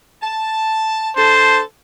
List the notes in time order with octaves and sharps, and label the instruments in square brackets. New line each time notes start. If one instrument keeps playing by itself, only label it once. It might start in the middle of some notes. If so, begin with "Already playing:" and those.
[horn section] A5
[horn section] D4 A4 A5 [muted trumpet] C5